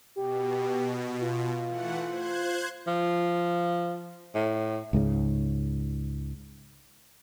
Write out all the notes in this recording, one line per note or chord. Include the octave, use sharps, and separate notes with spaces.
B2 G4
F4
E3 A3 F#5
C5 F#6 G#6
F3
A2
C#2 G#2 C#3